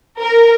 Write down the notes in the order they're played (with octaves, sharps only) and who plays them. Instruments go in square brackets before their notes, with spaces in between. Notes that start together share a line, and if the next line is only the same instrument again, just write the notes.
[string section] A#4